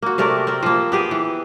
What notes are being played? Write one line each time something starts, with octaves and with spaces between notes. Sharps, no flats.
A#3 F#4
C3 A3 A#4 D5
C4 A#4
F3 A#3
B3 G4 G#4
E3